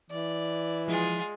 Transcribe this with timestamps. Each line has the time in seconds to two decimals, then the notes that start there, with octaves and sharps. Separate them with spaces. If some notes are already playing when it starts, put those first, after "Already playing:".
0.10 E3 D5
0.88 F3 G#3 E4 F4 G#4